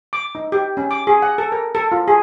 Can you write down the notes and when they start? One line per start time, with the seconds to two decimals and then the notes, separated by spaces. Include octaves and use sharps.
0.13 D6
0.35 D#4
0.52 G4
0.77 C#4
0.91 D6
1.07 G#4
1.22 F#5
1.38 A4
1.52 A#4
1.75 A4
1.92 F4
2.08 G#4